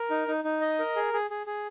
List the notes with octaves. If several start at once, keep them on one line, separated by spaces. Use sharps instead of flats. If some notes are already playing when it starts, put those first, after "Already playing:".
Already playing: A#4
D#4
D#4
D#4
D#5
A#4
G#4
G#4
G#4
G#4